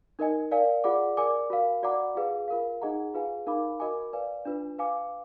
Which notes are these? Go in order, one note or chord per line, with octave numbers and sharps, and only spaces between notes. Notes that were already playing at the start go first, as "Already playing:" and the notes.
D#4 A#4 D#5 G#5
A#4 D5 F5 G#5
F4 G#4 D5 F#5 D6
A#4 D5 G#5 D6
F#4 A#4 F5
F#4 D5 F#5 A#5 D6
F4 G#4 B4 F5
F4 A#4 F5
D#4 G#4 D#5 F#5 A#5
F4 G#4 B4 F5 G#5
D#4 A#4 F5 B5 D6
F#4 A#4 D#5 G#5 D6
B4 D5 F5 G#5
D4 F4 B4
B4 F5 G#5 D6